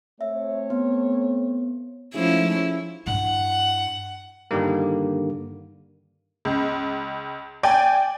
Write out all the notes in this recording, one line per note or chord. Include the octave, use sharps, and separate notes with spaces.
A3 C4 C#5 E5
B3
F3 G#3 A3 C#4 D#4 E4 G#4
G2 E4 F#5
G2 D3 D#3 G3 A#3
C#2
D5 G5 G#5